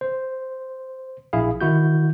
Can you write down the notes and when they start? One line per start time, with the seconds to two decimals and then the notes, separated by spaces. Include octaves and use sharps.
0.01 C5
1.33 A#1 E4 G#4 F5
1.61 D#3 E4 F#4 G6